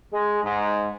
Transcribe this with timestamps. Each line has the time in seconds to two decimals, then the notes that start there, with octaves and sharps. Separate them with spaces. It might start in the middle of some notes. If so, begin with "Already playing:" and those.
0.12 G#3
0.43 G#2